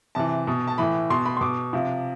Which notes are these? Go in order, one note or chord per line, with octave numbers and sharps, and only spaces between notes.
C3 E3 A5
B2
A5
A2 E3 B5
B2 C6
B5
C6
B2 D6
C3 F3